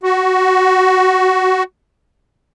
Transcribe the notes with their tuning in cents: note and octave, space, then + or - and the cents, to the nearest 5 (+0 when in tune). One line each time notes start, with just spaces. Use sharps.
F#4 +10